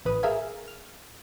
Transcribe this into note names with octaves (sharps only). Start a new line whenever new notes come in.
A1 B4 D#6
G#4 A#4 E5 F5 G#5
F6